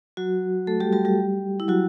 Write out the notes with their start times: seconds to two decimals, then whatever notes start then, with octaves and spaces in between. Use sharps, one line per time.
0.17 F#3 F#4
0.67 A3 A4
0.80 G3 G4
0.93 G3 G4
1.05 G3 G4
1.60 E4
1.68 F#3 F#4